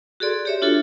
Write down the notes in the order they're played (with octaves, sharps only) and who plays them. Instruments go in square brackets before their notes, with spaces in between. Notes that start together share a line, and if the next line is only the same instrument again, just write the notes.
[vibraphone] F#4 G#4 A4 D5 C6
G4 C#5 E5
D4 F4 F#4 A4